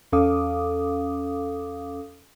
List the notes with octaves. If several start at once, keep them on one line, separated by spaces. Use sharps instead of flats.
E2 C#4 A4 F5 D6 D#6